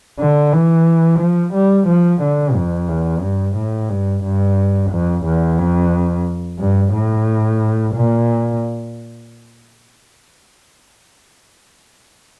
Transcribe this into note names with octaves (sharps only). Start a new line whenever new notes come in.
D3
E3
F3
G3
F3
D3
F2
E2
G2
A2
G2
G2
F2
E2
F2
G2
A2
A#2